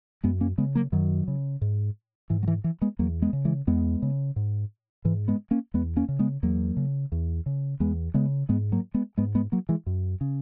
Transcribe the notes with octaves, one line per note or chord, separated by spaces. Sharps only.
F#2 G#3 B3
A#3 C#4
C#3 G#3 B3
F#3 A#3
F#2 D#3 F#3
C#3
G#2
G#2 E3
F#3
E3
E3
G#3 B3
E2 F#3 A#3
G#3 B3
C#3
E3 G#3
E2 G#3 B3
C#3
G#2
G#2 E3
G#3 B3
A#3 C#4
E2 G#3 B3
A#3 C#4
C#3
G#3 B3
E2 F#3 A#3
C#3
E2
C#3
E2 G#3 B3
C#3 G#3 B3
G#2 G#3 B3
F#3 A#3
G#3 B3
G#2 G#3 B3
G#3 B3
F#3 A#3
E3 G#3
F#2
C#3